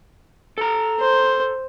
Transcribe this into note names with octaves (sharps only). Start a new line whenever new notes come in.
A4 A#5
C5